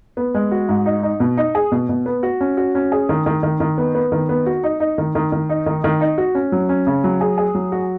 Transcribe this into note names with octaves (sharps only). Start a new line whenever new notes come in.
B3
G#3
F#4
G#2
D#4
D#4
B2
D#4
G#4
B2
B2
B3
F#4
C#4
F#4
C#4
G#4
D#3
D#3
D#3
D#3
B3
B3
D#3
B3
F#4
D#4
D#4
D#3
D#3
D#3
D#4
D#3
D#3
D#4
F#4
C#4
F#3
C#4
C#3
F#3
G#4
G#4
F#3
F#4